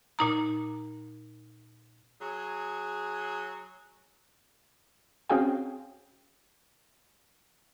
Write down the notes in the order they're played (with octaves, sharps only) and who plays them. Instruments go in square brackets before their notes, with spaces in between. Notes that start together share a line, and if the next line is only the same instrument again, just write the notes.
[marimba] A#2 D#4 A#5
[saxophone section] F#3 G#4
[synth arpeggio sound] C4 C#4 F#4 G#4 F5 G5